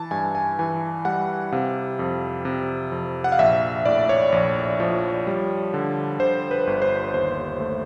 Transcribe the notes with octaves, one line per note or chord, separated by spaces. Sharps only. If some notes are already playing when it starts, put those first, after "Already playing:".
Already playing: E3 A5
G2 G#5
G#5
E3 G#5
G3 F#5
C3 F5
F2
C3
F2
F#5
F5
A#1 E5
A2 D5
C#5
A#1
F3
G3
D3
D3 C5
B4
G1
C5
D#2 C5
A3